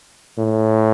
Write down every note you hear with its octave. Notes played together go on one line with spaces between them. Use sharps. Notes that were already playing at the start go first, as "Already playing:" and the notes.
A2